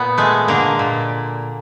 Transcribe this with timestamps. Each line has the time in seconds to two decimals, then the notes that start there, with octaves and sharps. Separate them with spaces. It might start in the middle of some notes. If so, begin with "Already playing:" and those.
Already playing: A#2 B3
0.18 G#3 A3
0.48 D3 A#3
0.79 A#2